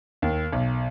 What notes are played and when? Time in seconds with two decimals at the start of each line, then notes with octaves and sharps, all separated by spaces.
0.22 D#2
0.52 B1